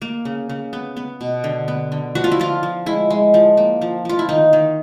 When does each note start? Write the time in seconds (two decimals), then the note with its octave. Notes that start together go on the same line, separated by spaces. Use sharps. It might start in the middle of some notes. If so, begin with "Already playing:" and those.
0.02 A#3
0.25 C#3
0.49 C#3
0.73 B3
0.97 B3
1.21 B2
1.44 D3
1.68 B3
1.92 D3
2.15 F3 F#4
2.24 F4
2.32 E4
2.39 F3 F4
2.63 F3
2.86 G#3 E4
3.10 G#3
3.34 F3
3.57 A#3
3.81 F3
4.05 F3 F4
4.19 E4
4.29 D#3 D#4
4.53 D#3